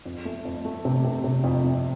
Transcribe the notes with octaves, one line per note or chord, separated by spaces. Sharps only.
F2
A3
F2
A3
C3
C3
C3
F2
F2